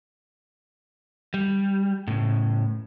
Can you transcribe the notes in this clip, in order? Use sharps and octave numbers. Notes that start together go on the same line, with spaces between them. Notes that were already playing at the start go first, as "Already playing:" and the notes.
G3
A2 C#3